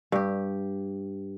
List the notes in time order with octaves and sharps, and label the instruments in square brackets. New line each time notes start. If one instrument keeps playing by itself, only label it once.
[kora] G2 G4